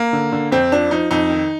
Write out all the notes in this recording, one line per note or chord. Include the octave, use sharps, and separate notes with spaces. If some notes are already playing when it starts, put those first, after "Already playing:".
Already playing: A#3
D3
D3
F2 C4
F3 D4
F3 D#4
F2 D#4
D#3